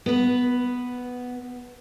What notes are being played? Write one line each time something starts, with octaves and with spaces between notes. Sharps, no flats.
B3 B4